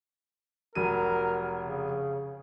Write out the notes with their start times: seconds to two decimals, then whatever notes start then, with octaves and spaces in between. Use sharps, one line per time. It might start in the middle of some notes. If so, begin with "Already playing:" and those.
0.75 F1 F#3 A#4 D#7
1.64 C#3